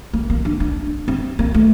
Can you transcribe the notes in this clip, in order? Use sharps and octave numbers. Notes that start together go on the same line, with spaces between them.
A#3
A#3
D4
D4
C4
A#3
A3